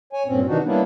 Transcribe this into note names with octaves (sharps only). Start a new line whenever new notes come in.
C#5 G#5
G2 A#2 C4 C#4
C3 D#3 E3 D4 D#4 F#4
G3 A#3 B3 C#4 D4 E4